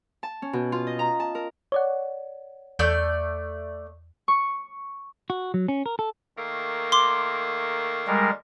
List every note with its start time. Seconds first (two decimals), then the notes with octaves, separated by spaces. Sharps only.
0.23 A5
0.42 C#4
0.53 B2
0.72 F4
0.87 D#5
0.99 A#5
1.20 A5
1.35 A#4
1.72 C#5 D5 F#5
2.79 E2 A3 D5 G6
4.28 C#6
5.30 F#4
5.54 F#3
5.68 C#4
5.86 A#4
5.99 A4
6.36 D#3 A3 A#3
6.92 C6 D6
8.07 G3 G#3 A#4